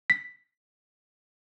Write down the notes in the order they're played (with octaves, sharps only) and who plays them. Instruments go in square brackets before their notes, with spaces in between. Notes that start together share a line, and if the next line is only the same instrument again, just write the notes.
[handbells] B6